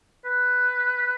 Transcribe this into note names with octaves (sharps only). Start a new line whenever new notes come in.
B4